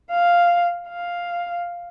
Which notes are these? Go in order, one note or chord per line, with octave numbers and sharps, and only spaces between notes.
F5
F5